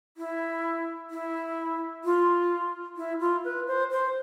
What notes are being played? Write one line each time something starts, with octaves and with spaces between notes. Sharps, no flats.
E4
E4
F4
E4
F4
B4
C5
C5